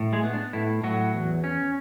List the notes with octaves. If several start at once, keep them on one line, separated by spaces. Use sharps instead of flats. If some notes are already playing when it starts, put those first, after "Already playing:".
Already playing: A2
G#3 G#4
B3
D4
A2 E4
A2 F#3 F#4
E2
C#4